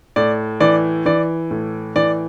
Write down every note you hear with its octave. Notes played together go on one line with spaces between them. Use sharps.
A2 D5
E3 D5
E3 D5
A2
E3 D5